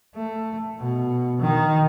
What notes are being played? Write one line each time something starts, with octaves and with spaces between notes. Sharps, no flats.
A3
B2
D#3